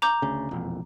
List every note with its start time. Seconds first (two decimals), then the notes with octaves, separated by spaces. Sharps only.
0.02 A#5 D6 G6
0.22 D2 C#3
0.51 E1 A#1 F2